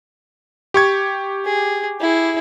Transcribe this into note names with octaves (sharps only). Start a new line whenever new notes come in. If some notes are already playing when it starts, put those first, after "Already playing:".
G4 C#6 G#6
G#4
E4 G#4